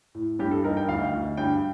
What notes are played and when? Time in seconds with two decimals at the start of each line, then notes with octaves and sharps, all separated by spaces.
0.15 A2
0.39 G2 G4
0.51 A4
0.64 D#4 A#4
0.77 G5
0.89 D2 F5
1.13 D2
1.37 G2 G5